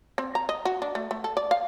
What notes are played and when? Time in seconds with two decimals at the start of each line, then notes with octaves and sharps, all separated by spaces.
0.18 C4
0.35 A#5
0.49 D#5
0.65 F#4
0.82 D4
0.95 A3
1.11 A3
1.24 A4
1.37 D5
1.51 F5